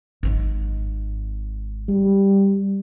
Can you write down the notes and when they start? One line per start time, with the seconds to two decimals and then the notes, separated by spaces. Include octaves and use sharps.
0.23 G#1 G#2
1.89 G3